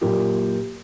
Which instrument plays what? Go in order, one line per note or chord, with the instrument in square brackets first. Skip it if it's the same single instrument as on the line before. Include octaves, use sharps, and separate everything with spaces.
[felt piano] F#2 A#2 A#3 G4